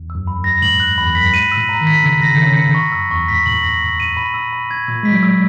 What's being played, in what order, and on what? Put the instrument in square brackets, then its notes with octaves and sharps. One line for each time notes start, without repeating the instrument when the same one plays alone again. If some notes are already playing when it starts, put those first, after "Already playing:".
Already playing: [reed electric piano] E2
[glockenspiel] E6
[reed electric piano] F#2
[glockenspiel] B5
[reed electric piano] F#2
[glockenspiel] A#6
[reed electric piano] G#2 [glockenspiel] F#7
[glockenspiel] F#6
[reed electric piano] E2 [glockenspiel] B5
[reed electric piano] F#2 [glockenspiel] B6
[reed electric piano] G#2 [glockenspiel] D#7
[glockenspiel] E6
[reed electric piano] A#2
[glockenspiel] A#5
[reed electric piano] D#3
[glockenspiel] B6
[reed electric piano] C#3 [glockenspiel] E6
[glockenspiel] A#6
[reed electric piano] C#3
D#3
[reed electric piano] C#3 [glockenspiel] E6
[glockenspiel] C#7
C#6
[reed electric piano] F#2 [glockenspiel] E6
[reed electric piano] E2 [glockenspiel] C#6
[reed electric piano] G#2 [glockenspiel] B6
[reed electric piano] A#2 [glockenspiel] F#7
[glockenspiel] A#6
E6
D#7
B5
E6
B5
G#6
[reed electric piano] A#2 [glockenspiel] E6
[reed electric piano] G#3 [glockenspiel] B6
[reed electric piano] F#3
[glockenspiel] E6